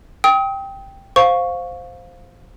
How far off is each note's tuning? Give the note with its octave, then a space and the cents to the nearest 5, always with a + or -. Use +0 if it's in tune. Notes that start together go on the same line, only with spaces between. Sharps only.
G5 +0 D#6 +40
C5 +0 F5 +15 C#6 +0